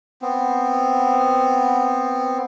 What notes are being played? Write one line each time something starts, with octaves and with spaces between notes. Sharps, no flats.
B3 C4